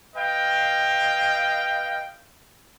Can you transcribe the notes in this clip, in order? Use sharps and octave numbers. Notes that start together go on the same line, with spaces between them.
B4 D#5 F5 G5